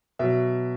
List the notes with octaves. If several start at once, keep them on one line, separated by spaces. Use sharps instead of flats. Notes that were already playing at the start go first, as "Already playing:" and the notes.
B2 F#3 E5